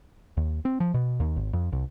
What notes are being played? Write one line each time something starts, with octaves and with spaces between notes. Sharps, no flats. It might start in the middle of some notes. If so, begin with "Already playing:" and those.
D#2
C4
F3
B2
D#2
G#1
F2
C2